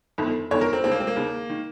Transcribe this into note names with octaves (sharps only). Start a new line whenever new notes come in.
G1 F2 D#3
G1 F2 D#3 C#5
A#4
C4
D#2 C#3 C4
A#3
C4
A#3
D#2 C#3
D#3